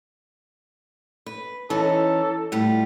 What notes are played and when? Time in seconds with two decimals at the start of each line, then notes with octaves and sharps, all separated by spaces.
1.26 B4
1.70 E3 C#4 D#4 A4
2.52 A2 G3 F4